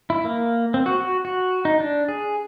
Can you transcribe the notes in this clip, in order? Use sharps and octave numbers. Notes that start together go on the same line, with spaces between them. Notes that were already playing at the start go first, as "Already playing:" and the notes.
E4
A#3
C4
F#4
F#4
F#4
D#4
D4
G#4